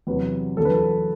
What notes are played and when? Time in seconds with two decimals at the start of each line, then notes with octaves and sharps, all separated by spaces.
0.07 E2 C3 F#3 B4
0.57 E2 D3 F#3 A4
0.65 B4
0.74 A4